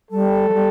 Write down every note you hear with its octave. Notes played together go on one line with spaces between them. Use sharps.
G3 A4
F3
G3